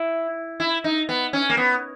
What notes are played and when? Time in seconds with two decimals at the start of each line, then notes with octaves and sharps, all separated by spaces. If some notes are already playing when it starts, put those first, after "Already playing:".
Already playing: E4
0.60 E4
0.84 D#4
1.09 B3
1.33 C#4
1.50 A#3
1.57 B3